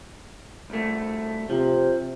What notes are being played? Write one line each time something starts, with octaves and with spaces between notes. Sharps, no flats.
C2 A3
C3 F3